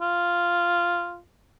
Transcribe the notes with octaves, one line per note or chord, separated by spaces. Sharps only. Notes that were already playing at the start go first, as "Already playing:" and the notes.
F4